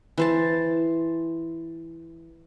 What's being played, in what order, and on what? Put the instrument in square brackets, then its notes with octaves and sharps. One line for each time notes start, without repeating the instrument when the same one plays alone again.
[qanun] E3 C5 A5